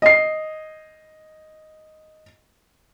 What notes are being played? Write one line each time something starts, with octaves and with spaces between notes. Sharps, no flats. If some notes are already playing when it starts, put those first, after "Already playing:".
D#5 C7